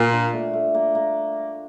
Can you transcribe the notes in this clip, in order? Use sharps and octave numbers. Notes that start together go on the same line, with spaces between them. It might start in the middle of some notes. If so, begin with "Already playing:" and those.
Already playing: A#2 A#3 F4
D4
A3
A3
A#3
A#3